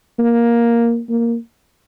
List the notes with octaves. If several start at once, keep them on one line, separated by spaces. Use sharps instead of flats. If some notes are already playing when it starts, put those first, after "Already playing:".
A#3
A#3